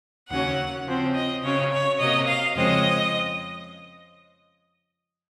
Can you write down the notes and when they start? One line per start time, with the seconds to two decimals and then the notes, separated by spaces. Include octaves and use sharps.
0.31 D#2 C#3 F#3 C#4 F#5
0.87 C#3 F3 C4
1.15 D#5
1.43 C#3 F#3 C#4 C#5
1.71 C#5
2.00 C3 F#3 A#3 D#5
2.28 F5
2.56 F2 C#3 G#3 C4 D#5